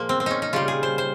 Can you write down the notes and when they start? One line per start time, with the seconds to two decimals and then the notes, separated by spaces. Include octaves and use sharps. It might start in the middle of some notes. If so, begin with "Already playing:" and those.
Already playing: A#2 F3 G#3 A#3
0.09 C4
0.20 C4
0.26 C#4 D#4
0.42 D#4
0.53 C#3 G3 F4
0.68 G#4
0.83 C5
0.98 C5